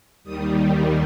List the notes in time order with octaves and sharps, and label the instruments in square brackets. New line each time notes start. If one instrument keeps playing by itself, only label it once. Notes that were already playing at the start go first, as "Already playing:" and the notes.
[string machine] D#2 D#3 G3 D#6